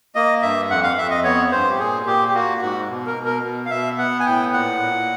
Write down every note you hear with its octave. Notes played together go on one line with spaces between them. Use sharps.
A#3 D#5
G2 E5
F2 F#5
F5
F2 E5
D#5
B3 C#5
G2 C5
G4
A#2 G#4
A#2 G4
G4
A#3 F#4
G#2 F#4
B2
A#4
B2
A#4
B2
F5
B2 E5
B3 F#5
G#5
A2 G5
A#2 F#5
A#2